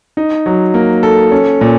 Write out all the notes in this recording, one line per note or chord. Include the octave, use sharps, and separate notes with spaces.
D#4
F#3
A#3
A4
C#4
A#2